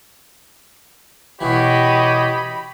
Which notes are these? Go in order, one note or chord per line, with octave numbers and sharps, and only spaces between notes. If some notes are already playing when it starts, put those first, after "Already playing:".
B2 E3 G4 C#5 D#5 B5